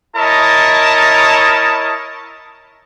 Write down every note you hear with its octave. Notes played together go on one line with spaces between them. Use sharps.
E4 A#4 C#5 D#5 A5